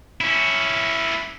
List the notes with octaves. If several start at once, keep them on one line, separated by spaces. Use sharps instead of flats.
C#4 E4